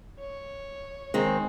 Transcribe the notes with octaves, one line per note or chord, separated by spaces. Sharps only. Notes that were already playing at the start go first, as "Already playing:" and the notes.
C#5
D#3 G#3 C4